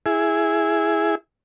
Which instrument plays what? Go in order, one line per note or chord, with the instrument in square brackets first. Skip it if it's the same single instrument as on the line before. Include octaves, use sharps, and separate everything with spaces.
[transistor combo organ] E4 G#4